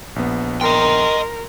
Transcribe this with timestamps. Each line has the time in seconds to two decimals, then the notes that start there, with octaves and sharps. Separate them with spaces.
0.16 A#1 B3
0.61 A#4 D#5 G5 C6